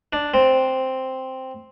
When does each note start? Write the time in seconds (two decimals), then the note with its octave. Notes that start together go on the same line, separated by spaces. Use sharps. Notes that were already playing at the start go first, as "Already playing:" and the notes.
0.13 D4
0.34 C4